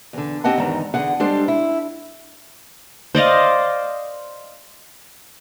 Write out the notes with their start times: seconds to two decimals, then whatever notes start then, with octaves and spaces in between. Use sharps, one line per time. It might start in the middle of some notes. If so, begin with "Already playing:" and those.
0.13 E2 D3
0.44 C4 G4 D#5 F#5 A5
0.58 E2 G#2 D3 D#3 A#5
0.94 E2 D3 G#4 F#5
1.20 G3 G#3 D4 A4 C5
1.48 E4
3.15 C5 D5 D#5 F5